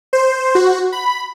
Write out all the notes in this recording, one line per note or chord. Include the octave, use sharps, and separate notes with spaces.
C5
F#4
B5